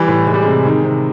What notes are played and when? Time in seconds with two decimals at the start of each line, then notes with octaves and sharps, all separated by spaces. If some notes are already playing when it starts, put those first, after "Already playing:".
Already playing: E3 G3
0.08 A2
0.27 E3 G#3
0.34 G3
0.42 C3 G#3
0.65 D#3
0.84 C3